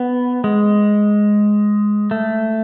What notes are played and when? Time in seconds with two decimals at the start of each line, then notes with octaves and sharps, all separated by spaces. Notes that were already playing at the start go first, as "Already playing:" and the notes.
Already playing: B3
0.44 G#3
2.11 A3